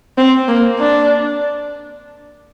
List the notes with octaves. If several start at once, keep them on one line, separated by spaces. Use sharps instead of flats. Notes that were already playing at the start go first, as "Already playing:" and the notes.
C4
A#3
D4